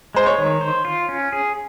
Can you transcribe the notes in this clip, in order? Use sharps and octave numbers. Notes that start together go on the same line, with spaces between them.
G#3 C5
C#5
D#3
C5
F4
C#4
G#4